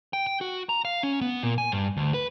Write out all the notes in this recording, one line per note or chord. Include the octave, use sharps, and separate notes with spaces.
G5
G5
F#4
A#5
F5
C#4
B3
A#2
G#5
G2
D2
B4